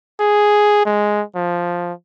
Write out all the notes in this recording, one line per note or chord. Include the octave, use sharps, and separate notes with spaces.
G#4
G#3
F3